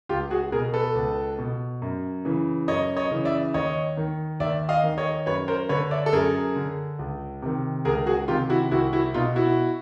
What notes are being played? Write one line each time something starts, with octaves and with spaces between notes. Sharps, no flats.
C#2 F4 G4
F#4 G#4
B2 G#4 A#4
A4 B4
C#2
B2
F#2
C#3 E3
F#2 C#5 D#5
C#5 D#5
C#3 E3
D5 E5
D#2 C#5 D#5
D#3
D#2 D5 E5
D#5 F5
D#3
C#5 D#5
F#2 B4 C#5
A#4 C5
D3 B4 C#5
D5 E5
A4
F#2 G#4 A#4
D3
C#2
C3 D#3
C#2 G#4 A#4
F#4 G#4
C3 D#3 F4 G4
E4 F#4
C2 E4 F#4
E4 F#4
B2 D#4 F4
E4 F#4